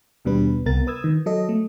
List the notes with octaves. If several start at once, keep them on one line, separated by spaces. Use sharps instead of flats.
D#2 B2 G3 D4 B4
C2 B3 A#4 A6
B4 D#6 E6 G#6
D#3
F#3 A4 D#5
A3